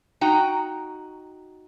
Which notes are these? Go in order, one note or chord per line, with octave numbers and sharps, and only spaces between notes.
D#4 F#4 G5 A#5